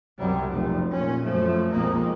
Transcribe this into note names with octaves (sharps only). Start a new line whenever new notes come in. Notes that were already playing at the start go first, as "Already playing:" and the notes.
C2 F#2 F#3 G3
F1 A3
A#2 C#4
F#2 F3 A3
B1 F2 G#3 A#3